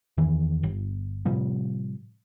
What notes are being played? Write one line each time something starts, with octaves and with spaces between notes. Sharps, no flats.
E2 D#3 E3
G1
A2 C3 F3 G3